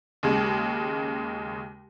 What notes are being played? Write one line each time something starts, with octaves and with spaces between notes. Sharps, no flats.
D#2 C#3 G#3